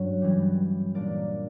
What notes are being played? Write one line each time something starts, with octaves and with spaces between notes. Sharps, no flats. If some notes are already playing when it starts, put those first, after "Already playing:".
Already playing: G2 F#3 C#4
G2 E3 G3
A#2 A#3 D4 A#4 D5